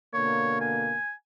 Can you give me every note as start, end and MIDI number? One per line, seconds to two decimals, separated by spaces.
0.14 0.98 47
0.14 0.98 50
0.14 0.98 58
0.14 0.59 73
0.61 1.12 80